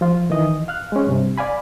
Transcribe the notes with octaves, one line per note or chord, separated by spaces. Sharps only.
F3 F4
D#3 E3 D#5
F5 F6 F#6
G#3 C#4
G2 C3
D5 F5 G#5 B5